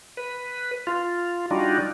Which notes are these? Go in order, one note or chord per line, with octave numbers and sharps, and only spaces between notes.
B4
F4
G3 D4 D#4 F4 F#4